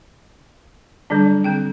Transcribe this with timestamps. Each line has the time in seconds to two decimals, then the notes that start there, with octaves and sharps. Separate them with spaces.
1.10 D3 F#3 G3 D4
1.44 D3 C4 G5